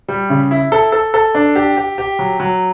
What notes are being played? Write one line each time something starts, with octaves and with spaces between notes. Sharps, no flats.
G3
C#3
E4
A4
A4
A4
D4
G4
G4
G4
F#3
F#3